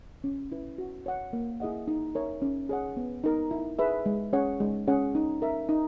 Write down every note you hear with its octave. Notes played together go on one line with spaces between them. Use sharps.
C#4
E4 B4
F#4
C#5 F#5
A#3
E4 G#4 D#5 F#5
D#4
A#4 C#5 E5
C#4
G#4 C#5 F#5
B3
D#4 A#4
E4
G#4 B4 E5
G#3
C#4 G#4 C#5 F#5
G#3
C#4 G#4 C#5 F#5
D#4
A#4 E5
D#4